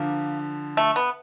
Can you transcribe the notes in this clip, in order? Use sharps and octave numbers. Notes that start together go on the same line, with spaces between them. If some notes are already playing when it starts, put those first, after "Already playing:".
Already playing: D3 F3 A#3
A3
B3